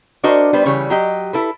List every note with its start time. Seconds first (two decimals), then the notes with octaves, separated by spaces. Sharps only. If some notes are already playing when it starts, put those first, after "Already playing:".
0.24 D4 F#4 A#4 C5 D#5
0.53 G3 B3 B4 C5
0.65 C#3 E3 G3 C#5
0.90 F#3 G4 D#5
1.33 E4 A4 B4